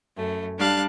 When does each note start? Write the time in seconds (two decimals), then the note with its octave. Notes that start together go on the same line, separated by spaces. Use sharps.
0.16 F#2 A3
0.58 G3 D4 F5 A5 F#6